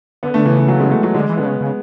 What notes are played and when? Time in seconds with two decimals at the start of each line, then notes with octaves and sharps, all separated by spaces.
0.23 D3 B3
0.34 D3 A3
0.46 C#3 E3
0.57 E3
0.68 F#3
0.80 G#3
0.92 A3
1.03 F#3
1.14 D3 G#3
1.29 E3
1.37 D3 B3
1.45 C#3
1.61 C#3